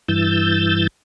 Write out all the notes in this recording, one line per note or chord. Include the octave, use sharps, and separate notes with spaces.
G2 E3 E6 G6 A6